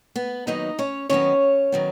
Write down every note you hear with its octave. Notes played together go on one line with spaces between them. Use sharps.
B3 B4
D#2 D#3 F#3 B3 D#4 D#5
C#4 C#5
D#2 D#3 F#3 B3 C#4 C#5
D#3 F#3 B3